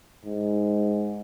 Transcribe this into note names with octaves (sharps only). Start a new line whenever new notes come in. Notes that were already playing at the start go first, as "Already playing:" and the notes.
G#2